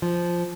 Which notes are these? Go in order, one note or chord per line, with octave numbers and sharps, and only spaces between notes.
F3